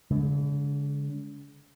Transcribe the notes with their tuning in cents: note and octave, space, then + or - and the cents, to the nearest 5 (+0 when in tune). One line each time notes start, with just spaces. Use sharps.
D3 -45 G#3 +0